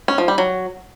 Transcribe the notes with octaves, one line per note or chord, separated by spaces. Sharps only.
C#4
F3
G3
F#3